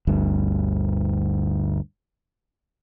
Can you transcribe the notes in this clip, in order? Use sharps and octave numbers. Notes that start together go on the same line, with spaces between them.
G1 D2 G2